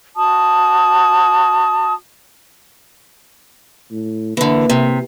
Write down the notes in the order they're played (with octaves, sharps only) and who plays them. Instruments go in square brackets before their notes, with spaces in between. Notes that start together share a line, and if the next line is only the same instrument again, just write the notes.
[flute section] F#4 A5 D#6
[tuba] A2
[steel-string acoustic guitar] D3 E3 [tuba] A#3
[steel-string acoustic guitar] C3